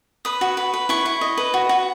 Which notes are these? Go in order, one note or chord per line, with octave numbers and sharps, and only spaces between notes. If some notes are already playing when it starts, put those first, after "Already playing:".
B4 D#6
F#4
B4
B4
E4 C#6
E4
D#5
B4
F#4
F#4